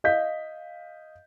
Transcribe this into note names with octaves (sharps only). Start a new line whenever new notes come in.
D#5 F5 G6 B6